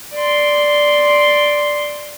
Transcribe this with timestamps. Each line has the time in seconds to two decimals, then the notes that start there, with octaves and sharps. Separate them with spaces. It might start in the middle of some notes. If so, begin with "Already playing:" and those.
0.14 D5 C6